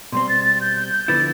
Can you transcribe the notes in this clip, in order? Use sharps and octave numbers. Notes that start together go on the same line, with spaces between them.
B2 G3 C4 C6
A6
A6
G6
G6
G6
D3 F3 B3 E4 A6